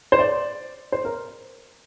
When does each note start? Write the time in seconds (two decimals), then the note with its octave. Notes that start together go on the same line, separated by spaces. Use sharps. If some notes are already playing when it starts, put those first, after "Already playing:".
0.12 C5
0.19 D5
0.92 C5
1.05 A#4